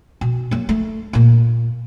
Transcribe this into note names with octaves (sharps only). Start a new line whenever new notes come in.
B2
F#3 A#3
A3
A#2 A#3